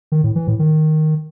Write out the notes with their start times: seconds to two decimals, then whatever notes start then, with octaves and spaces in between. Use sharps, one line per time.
0.12 D#3
0.24 A2
0.36 E3
0.47 A2
0.59 D#3